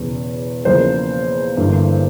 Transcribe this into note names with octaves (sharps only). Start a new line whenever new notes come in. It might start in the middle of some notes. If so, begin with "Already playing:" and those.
Already playing: E1 E2 C#3
E2 C#3 F3 A#3 C5
G1 G2 E3 A#3